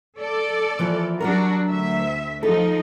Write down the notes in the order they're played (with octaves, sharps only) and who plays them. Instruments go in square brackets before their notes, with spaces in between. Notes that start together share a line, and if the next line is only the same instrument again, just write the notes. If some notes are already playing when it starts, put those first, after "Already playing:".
[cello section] A4 D5
[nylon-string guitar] E3 F3 A#3
[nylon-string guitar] F#3 G3 A#4 [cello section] D4 F#4
[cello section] D2 E5
[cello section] F3 D#4 [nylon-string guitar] A4